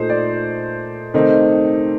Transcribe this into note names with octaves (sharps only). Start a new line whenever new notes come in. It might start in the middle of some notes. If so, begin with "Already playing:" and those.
Already playing: A#2 A3 D#4 C5
D5
C3 D#3 A3 C4 D#4